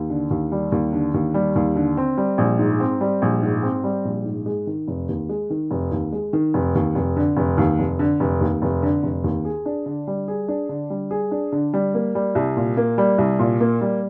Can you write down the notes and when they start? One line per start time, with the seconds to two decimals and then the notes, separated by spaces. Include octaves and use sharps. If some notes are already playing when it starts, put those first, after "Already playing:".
Already playing: D#2
0.10 D3
0.30 D#2
0.52 G3
0.72 D#2
0.93 D3
1.14 D#2
1.34 G3
1.55 D#2
1.76 D3
1.97 C4
2.17 G3
2.38 A#1
2.59 G#2
2.80 C4
3.01 G3
3.22 A#1
3.42 G#2
3.63 C4
3.84 G3
4.05 A#1
4.25 G#2
4.46 G#3
4.67 D#3
4.87 F1
5.09 D#2
5.29 G#3
5.50 D#3
5.71 F1
5.91 D#2
6.12 G#3
6.33 D#3
6.54 F1
6.75 D#2
6.95 F1
7.16 D3
7.37 F1
7.57 D#2
7.79 F1
7.99 D3
8.20 F1
8.41 D#2
8.62 F1
8.83 D3
9.03 F1
9.24 D#2
9.45 G#4
9.66 D4
9.86 D3
10.07 G3
10.28 G#4
10.48 D4
10.69 D3
10.90 G3
11.11 G#4
11.31 D4
11.52 D3
11.74 G3
11.94 A#3
12.15 G3
12.35 C2
12.56 A#2
12.77 A#3
12.98 G3
13.18 C2
13.39 A#2
13.60 A#3
13.81 G3